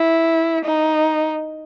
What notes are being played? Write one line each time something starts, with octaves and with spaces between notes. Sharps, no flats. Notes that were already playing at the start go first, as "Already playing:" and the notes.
Already playing: E4
D#4